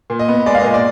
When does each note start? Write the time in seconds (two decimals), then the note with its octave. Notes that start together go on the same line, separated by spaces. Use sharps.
0.10 A#2
0.19 D#5
0.28 B3
0.46 G#3 D5
0.54 F5
0.60 A#2 D#5
0.74 D5